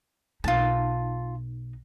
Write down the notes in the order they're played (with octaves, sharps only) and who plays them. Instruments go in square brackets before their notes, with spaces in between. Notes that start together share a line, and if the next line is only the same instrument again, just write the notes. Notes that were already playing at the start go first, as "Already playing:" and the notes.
[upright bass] B1 D#4 [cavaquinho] F4 A5